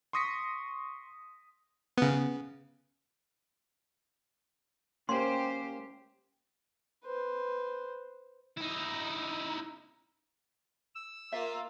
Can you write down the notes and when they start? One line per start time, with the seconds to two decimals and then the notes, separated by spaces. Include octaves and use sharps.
0.13 C6 C#6 D#6 A#6 B6 C#7
1.97 C#3 B3
5.09 A#3 C#4 G4 C5 C6
7.05 B4 C5
8.57 D#4 E4
10.95 E6
11.32 A#3 F4 E5